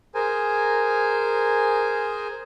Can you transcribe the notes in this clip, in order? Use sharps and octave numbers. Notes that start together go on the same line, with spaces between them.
G#4 A#4 C5 G#5